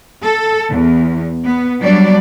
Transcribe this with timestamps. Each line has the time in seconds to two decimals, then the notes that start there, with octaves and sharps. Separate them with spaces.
0.23 A4
0.70 E2
1.45 B3
1.81 F#3 G3 B3 D4 D5